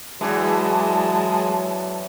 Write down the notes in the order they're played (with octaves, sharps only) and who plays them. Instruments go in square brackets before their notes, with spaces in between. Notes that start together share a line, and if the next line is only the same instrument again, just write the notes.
[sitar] E2 G#2 E3 [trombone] F#3 [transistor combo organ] G#3 [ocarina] A5